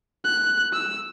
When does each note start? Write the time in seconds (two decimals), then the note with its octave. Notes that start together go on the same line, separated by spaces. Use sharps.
0.25 F#6
0.73 E6